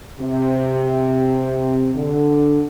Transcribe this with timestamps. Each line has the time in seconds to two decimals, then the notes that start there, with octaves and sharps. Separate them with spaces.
0.20 C3
1.95 D3